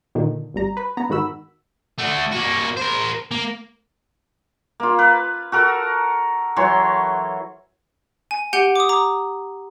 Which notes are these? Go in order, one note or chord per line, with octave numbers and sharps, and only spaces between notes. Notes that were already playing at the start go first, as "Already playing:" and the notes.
A#2 D3 D#3
G#1 G3 A#5
B4
B3 A#5
G#2 D#3 F#4 B5 E6
A3 F#4
A#3 F#4
A#4 C5
A#3
A#3 F4
B4
F#4 A4 A#4
E3 F#3 C#5 C6
G#5
G4 F#5 G5 G6 D#7 G7
D6 D#6
A#5 D6 D#6